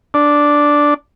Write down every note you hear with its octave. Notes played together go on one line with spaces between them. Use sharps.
D4